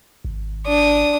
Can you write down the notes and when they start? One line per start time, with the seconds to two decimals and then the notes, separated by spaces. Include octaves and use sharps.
0.25 G#1
0.67 D4 D#6